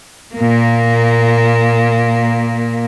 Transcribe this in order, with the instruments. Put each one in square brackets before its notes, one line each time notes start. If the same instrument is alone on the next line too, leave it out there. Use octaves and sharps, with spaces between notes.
[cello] A#2 A#3